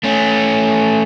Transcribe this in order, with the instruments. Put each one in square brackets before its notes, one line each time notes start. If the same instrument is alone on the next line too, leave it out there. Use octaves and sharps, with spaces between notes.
[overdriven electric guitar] A3 C#4